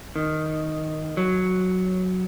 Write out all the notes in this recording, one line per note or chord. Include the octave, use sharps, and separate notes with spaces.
D#3
F#3